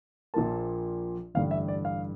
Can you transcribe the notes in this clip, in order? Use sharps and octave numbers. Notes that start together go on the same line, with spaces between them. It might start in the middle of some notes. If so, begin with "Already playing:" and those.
A#1 A#2 F3 A#3 A5
A1 G2 D3 F5
E5
D5
F5